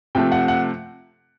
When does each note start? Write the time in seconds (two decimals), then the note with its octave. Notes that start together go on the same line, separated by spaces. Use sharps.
0.15 C3 F3 A3 G5
0.32 F#5
0.48 F#5